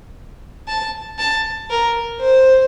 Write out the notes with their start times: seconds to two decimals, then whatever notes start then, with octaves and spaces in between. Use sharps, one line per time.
0.68 A5
1.19 A5
1.70 A#4
2.20 C5